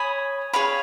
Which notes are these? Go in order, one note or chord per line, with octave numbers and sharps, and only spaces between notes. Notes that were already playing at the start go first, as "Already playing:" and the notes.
Already playing: C#5 G#5 B5 D#6
G#4 C#5 F5 B5